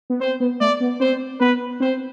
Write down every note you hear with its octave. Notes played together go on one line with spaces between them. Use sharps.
B3
C4 C5
B3
A3 D5
B3
C4 C5
B3 B4
C4 C5